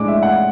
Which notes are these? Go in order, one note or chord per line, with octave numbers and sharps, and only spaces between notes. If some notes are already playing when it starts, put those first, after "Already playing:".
Already playing: A2 G#3 D4 D6
E5
F#5